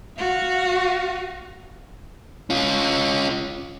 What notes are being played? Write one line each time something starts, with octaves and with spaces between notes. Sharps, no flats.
F#4 F5
C#4 F4